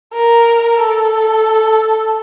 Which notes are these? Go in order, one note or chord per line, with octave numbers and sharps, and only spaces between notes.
A#4
A4